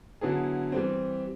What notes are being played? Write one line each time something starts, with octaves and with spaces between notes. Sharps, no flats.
D3 F#3 B3 E4 G#4
E3 G3 C4